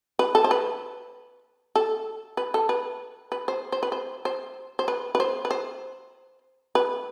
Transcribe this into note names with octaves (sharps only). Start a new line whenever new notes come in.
B4
A4
C5
B4
A4
B4
A4
B4
B4
C5
C5
B4
C5
C5
C5
B4
B4
C5
B4
C5
B4